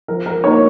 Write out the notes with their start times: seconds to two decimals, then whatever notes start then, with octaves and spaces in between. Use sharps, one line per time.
0.08 F3 A#4
0.26 A#4
0.44 A#3 D#4 C#5